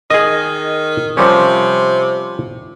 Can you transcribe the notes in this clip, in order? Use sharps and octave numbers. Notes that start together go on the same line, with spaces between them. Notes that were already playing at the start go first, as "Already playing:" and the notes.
D#3 G#4 D#5
C3 F3 G3 C#4